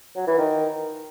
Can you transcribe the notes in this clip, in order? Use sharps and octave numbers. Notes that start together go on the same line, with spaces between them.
F#3
E3
D#3